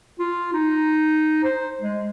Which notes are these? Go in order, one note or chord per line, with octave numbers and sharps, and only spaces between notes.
F4
D#4
C5
G#3